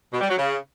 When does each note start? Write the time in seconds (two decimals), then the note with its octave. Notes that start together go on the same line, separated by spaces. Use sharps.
0.12 B2
0.21 G3
0.29 F#3
0.37 C#3